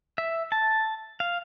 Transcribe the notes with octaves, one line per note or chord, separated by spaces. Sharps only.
E5
A5
F5